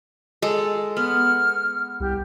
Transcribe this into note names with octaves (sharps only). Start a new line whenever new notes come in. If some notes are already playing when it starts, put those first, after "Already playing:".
G#3 A4
B3 F6
C2 G4